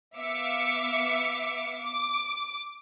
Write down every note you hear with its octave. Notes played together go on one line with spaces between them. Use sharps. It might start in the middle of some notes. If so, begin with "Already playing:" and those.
B3 E5 F5 D6 C#7
D6